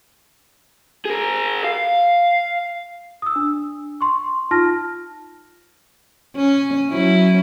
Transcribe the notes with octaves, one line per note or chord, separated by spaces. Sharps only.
G#4 A#4
F5
D#6 E6
D4
C6 C#6
D#4 F4 A5 F6 A#6
C#4
F#3 C#4 E4